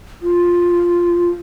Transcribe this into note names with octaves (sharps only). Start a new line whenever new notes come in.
F4